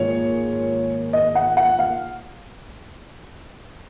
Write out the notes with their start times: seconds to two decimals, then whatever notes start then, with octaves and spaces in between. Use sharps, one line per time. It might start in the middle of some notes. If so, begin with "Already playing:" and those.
Already playing: G#2 D#3 A#3 F4 G#4 C#5
1.13 D#5
1.35 F#5
1.57 F#5
1.79 F5